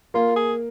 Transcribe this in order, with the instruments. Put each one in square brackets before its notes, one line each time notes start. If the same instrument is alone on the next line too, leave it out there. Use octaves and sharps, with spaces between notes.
[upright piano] A#3 [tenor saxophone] F4
[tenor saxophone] G#4